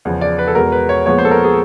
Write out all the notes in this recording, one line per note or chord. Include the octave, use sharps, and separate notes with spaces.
E2 C#3 F3
D5
B4
A4
E2 B2 G#3 B3 A#4
B4
C#5
A#2 F3 G#3 B3 C#5
C5
A4
A#4
G#4